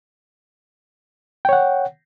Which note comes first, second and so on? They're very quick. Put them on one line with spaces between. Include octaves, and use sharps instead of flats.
G5 C#5 F#5